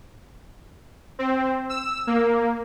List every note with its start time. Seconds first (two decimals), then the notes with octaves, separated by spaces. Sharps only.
1.19 C4
1.69 E6
2.07 A#3